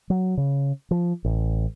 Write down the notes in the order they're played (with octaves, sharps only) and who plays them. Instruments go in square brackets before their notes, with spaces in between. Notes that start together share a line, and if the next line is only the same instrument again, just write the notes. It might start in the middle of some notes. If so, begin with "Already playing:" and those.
[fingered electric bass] F#3
C#3
F3
A1